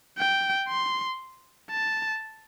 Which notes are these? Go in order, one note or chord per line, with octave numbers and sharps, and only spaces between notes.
G5
C6
A5